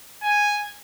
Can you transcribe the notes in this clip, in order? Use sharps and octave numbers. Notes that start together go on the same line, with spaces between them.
G#5